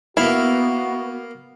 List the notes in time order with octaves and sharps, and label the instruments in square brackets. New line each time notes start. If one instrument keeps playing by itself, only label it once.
[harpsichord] A#3 F5 [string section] B3 [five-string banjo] E4 [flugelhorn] F#4